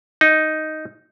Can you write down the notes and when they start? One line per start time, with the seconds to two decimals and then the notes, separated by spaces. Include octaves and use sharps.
0.21 D#4